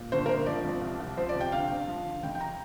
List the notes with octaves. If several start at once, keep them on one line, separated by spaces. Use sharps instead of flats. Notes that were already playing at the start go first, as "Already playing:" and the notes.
Already playing: A#2
G1 C5
A#4
G1 C5
F3 D5
F2
C2
C2
F3 C5
D5
C3
G5
D2 F5
D2
F3
D3
F1 G5
G5
A#5